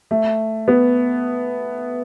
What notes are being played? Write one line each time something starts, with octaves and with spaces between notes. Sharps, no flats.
A3
B3